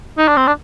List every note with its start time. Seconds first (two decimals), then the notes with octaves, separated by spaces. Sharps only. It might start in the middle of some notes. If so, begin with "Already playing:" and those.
0.18 D#4
0.28 D4
0.37 C4
0.47 D4